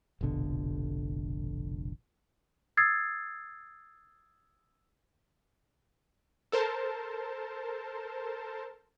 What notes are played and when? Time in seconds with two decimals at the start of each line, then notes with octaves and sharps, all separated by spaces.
0.21 F1 A#1 B2 D3
2.77 D#6 E6 G#6 A6 C7
6.52 A4 A#4 C5 A5